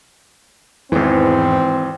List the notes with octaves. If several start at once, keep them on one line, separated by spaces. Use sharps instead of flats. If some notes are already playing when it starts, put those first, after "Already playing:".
G#1 E2 G#2 E3 C4